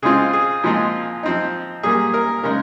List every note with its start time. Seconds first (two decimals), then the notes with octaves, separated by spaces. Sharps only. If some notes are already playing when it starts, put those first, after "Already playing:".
0.02 C#3 G#3 C4 F4 G#4
0.33 G#4
0.63 A#2 F3 G#3 C4 F4
1.23 F3 C4 D#4
1.83 A#2 G3 A#3 G#4
2.14 A#4
2.43 C#3 G#3 D#4 A#4